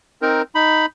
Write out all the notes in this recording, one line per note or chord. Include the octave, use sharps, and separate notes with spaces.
C4 D#4 A#4
D#4 B5